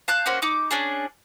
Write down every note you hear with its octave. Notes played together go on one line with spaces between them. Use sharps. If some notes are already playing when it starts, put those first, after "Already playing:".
F5 A5 F#6 G6
A#3 C#4 F#4 C5
D#4 D6
C#4 D4 G#4